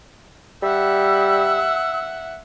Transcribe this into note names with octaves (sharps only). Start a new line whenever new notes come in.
G3 E5 F#5 E6